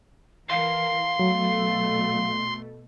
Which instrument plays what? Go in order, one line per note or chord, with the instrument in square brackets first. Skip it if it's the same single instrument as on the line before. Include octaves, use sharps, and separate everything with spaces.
[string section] E3 A#4 [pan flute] F5 [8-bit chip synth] C6
[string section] B2 A3 [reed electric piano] F#3